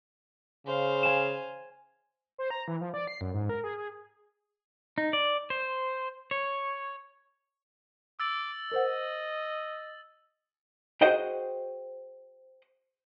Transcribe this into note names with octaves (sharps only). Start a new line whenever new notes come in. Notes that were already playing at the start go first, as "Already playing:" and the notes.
C#3 C5 F5
G#5 E7
C5
A#5
E3
F3
D5
C7
F#2
G#2
A#4
G#4
G#4
D#4
D5
C5
C#5
D6 E6 A6 F#7
A#4 C5 D#5 F#5
F#4 G#4 C5 D#5 F#5 G5